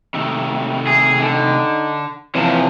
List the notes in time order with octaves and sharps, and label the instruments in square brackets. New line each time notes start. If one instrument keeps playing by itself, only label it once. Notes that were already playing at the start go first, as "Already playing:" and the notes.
[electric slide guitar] C3 D#3 A3
[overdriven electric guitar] G#4
[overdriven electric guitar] D3 [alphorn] D#4
[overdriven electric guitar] C3 F3 [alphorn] E3 [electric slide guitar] C#5 G#5 A5